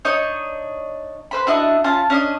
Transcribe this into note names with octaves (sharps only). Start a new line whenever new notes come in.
D4 D#4 C#5 D#5
B4 C5 B5
D4 E4 F#4 D#5
C#4 F4 A5
C#4 D4 D#5